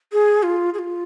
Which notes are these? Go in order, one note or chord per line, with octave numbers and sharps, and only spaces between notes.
G#4
F4
G#4
F4